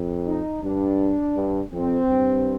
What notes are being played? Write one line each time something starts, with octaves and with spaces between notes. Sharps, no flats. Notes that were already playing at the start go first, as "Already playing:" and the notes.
Already playing: F2
D#4
G2 D4
G2
F2 C4
G2